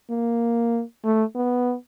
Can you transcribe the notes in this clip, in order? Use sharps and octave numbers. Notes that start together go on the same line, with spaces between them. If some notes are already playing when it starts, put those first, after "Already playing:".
A#3
A3
B3